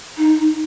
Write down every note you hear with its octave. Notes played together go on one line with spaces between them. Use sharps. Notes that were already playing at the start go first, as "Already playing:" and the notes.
D#4